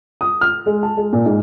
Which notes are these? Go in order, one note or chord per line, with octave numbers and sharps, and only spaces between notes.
D#6
F6
G#3
A5
G#3
A#2
G#2